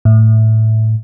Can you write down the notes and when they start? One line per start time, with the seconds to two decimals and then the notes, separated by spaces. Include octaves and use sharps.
0.05 A2